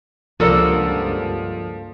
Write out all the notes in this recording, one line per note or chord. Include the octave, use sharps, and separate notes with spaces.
C#2 G2 F3 A#3 F#4 A4 A#4 D5